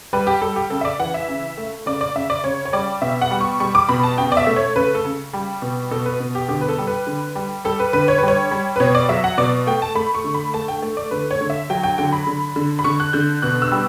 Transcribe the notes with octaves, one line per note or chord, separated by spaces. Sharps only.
G3 B4
G4
G3 A4
G4
C#3 A4
E5
D5
E3 F#5
E5
C#3
A3
C#3 D5
D5
C#3 E5
D5
C#3 C#5
C#5
G3 D5
B2 E5
F#5
G3
C#6
G3 C#6
D6
B2 B5
A5
C#3 G5
D5
E5
A3
C#5
C#3 B4
A4
C#3
G3
B2
B2 A4
B4
B2
G4
D3 G4
B4
A4
G3
B4
D3
G3
G3 A4
B4
D3 B4
C#5
G3 B4
C#5
G3
B4
B2 C#5
D5
F#3 E5
F#5
B2 D5
A3 G5
A5
A3 B5
C#6
D3
B5
A3 A5
G5
A3
D5
D3 B4
C#5
D3
E5
F#3 G5
G5
D3 G5
B5
D3
D3
B5
D3 C#6
F#6
D3 G6
B2 F#6
E6
G3